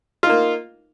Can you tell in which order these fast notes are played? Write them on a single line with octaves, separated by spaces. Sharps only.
F4 D#4 A#3